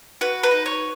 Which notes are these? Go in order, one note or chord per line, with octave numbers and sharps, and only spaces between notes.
F#4 B4
B4
D#4
C#5